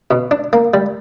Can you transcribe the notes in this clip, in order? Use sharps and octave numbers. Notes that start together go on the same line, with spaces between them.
B2
D4
A#3
G3